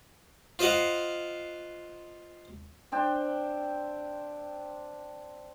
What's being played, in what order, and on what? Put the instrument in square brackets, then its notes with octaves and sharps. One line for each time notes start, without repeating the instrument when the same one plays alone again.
[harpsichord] F4 C5 D#5 F5 F#5
[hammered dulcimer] C4 D4 G5